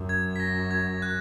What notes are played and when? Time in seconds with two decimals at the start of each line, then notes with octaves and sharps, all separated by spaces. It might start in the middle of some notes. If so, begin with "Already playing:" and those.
Already playing: F#2
0.09 G#6
0.36 B6
0.40 A#6
0.71 G#6
1.02 F#6